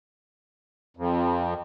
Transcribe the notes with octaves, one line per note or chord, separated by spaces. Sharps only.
F2